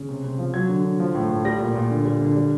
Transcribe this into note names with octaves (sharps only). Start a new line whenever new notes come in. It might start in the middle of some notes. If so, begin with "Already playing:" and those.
Already playing: C#3
C3
C3
F3
F#3 G#6
D3
D3
F3
A2
A2
G3 A#6
A#2
A#2
D3
G3
D3
G3